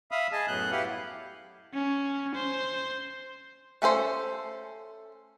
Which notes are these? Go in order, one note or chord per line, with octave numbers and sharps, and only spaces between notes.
E5 F5 B5 D#6
G#4 D#5 G#5 A5
F#2 A2 F#3 B3 F#6 G6
E4 G4 B4 F5 F#5
F#3
C#4
C5
A3 C#4 A4 C5